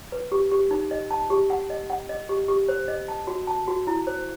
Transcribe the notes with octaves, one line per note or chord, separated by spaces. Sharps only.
B4
G4
G4
D#4
D#5
A5
G4
F#5
D#5
F#5
D#5
G4
G4
C5
D#5
A5
F#4
A5
F#4
E4
C5